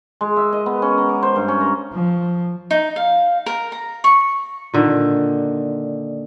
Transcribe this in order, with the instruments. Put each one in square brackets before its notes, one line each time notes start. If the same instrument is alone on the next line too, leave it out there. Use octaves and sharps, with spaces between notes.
[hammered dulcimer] G#3
E5
D#5
B3
C#4
A#5
D6
C5
G2
C#4
A#5
[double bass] F3
[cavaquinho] D#4
F5
A#4
A#5
C#6
[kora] A#2 D3 D#3